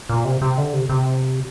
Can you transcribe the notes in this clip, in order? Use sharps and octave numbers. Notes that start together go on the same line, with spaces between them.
A#2
C3
C3
D3
C3
C3